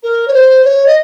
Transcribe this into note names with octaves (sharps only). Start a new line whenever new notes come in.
A#4
C#5
C5
C#5
D#5